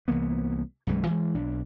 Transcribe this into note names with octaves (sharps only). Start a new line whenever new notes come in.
C2 E3 A#3 B3
B1 F#2 E3 G#3
E3 G#3
B1 D4